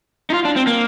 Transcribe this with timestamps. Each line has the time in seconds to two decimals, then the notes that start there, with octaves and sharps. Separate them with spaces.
0.30 D#4
0.34 F4
0.45 D4
0.56 C4
0.67 A#3